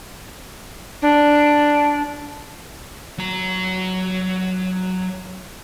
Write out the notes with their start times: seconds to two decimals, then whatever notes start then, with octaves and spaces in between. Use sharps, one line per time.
1.02 D4
3.18 F#3 A#5